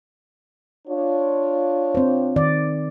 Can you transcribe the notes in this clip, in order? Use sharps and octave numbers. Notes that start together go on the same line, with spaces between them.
D4 F4 C#5
C4 C5
D#3 D5